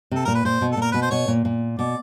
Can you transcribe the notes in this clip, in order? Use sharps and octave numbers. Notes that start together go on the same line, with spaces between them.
C3 A4
A#2 A#4
B4
A#2 C5
B2
A4
A#2 A#4
B2 B4
C5
B2 C#5
A#2
A#2
B2 D5